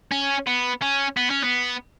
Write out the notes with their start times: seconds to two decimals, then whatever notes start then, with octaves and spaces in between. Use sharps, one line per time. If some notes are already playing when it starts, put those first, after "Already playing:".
0.12 C#4
0.47 B3
0.82 C#4
1.17 B3
1.30 C#4
1.44 B3